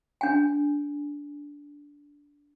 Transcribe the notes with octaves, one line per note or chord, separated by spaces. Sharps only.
D4 G#5